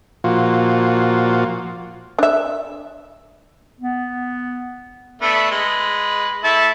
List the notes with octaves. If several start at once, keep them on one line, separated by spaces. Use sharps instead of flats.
A#2 F3 F4 F#4
D4 E5
B3
A3 B3 D4
G#3 B4
A3 E4 A5